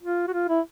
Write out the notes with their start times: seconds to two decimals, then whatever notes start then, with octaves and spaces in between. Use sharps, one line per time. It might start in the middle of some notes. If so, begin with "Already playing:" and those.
0.03 F4
0.28 F#4
0.33 F4
0.49 E4